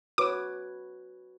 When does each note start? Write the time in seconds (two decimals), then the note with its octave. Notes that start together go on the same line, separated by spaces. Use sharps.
0.18 F#4 B4 C#5 D6